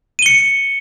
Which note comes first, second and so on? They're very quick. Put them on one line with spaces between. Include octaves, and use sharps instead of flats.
D#7 G7 C#7